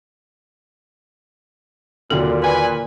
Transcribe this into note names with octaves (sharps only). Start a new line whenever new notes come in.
D#2 A#2 D3 F#3 A4
B4 G#5